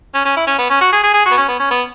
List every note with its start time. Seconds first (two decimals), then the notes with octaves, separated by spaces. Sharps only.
0.14 C#4
0.25 C#4
0.37 E4
0.47 C#4
0.58 B3
0.70 C#4
0.81 F#4
0.92 G#4
1.04 G#4
1.14 G#4
1.26 F#4
1.32 B3
1.37 C#4
1.48 B3
1.60 C#4
1.70 B3